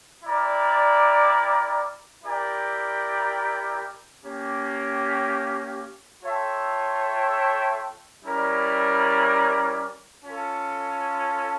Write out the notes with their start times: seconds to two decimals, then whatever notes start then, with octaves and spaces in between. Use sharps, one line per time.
0.24 E4 A#4 D5 G5
2.24 E4 G4 A#4 D5 G5
4.24 A#3 C#4 G4
6.24 F4 A4 C#5 E5 G5
8.24 G3 C#4 E4 A#4 D5
10.24 C#4 F4 A4